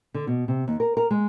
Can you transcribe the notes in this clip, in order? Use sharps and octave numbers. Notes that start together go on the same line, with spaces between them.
D3
B2
C3
D#2
A#4
A#4
G#3